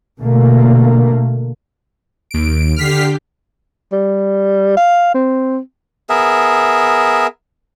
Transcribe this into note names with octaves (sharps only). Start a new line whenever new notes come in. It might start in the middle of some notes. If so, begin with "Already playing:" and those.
B2 D3 A3 A#3
D#2 D7
D3 G4 F6 B6 C7
G3
F5
C4
B3 G#4 A#4 E5